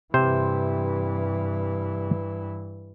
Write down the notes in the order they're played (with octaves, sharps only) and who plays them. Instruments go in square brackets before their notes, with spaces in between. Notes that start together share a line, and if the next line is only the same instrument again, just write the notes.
[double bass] G2 E3 [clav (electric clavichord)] C3 C5